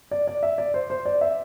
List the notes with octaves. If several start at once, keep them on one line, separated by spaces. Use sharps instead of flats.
D5
D5
E5
D5
C5
C5
D5
E5